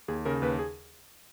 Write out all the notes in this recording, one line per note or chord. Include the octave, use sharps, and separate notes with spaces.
D#2 G#4
C#3 A#4
D#2 B4
G#4